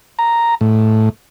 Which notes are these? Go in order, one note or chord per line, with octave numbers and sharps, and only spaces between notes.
A#5
A2